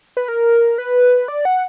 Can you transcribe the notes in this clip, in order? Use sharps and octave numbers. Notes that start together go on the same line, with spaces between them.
B4
A#4
B4
D5
F#5